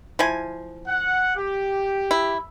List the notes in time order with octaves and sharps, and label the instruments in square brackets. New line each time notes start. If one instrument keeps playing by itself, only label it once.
[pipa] F3 E4 G#5
[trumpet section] F#5
G4
[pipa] E4